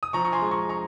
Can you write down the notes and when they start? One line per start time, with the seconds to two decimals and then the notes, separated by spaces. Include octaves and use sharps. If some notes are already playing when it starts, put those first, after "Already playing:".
0.03 D#6
0.13 F3 A#5 C#6
0.25 C#6
0.32 G#5 C6
0.42 G#3
0.51 A#5 C#6
0.69 A#5 C#6